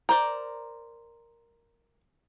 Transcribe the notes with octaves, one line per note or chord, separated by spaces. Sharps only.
A#4 C5 D5